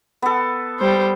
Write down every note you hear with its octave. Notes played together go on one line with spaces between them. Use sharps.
B3 A4
G3 C5